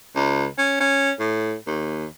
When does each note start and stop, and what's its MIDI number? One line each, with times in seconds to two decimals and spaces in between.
0.16 0.46 37
0.58 0.77 61
0.80 1.11 61
1.19 1.54 45
1.67 2.06 39